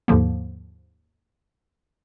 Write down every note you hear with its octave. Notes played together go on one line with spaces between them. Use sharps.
D#2 G#2 D3 F3 A#3